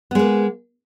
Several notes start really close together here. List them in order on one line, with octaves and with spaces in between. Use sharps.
B3 G#3 A#3